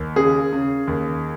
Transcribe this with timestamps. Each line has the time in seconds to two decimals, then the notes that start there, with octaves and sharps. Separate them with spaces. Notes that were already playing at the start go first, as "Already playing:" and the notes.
Already playing: D#2
0.16 C#3 G#4
0.53 C#3
0.88 D#2